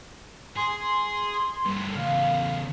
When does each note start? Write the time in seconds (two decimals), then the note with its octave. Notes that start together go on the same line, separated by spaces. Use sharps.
0.57 G#4 C6
1.65 G2 A3
1.95 E2 C#3 F5